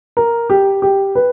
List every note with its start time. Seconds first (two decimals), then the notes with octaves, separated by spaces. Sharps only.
0.17 A#4
0.50 G4
0.82 G4
1.15 B4